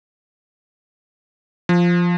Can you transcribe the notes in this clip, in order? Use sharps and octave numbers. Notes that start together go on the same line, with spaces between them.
F3